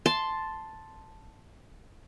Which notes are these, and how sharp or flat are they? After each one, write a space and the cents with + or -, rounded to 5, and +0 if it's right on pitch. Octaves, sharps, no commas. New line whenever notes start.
A5 +0 C6 +0